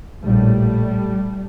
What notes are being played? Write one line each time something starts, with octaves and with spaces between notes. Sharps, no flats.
A#1 A2 G3 A3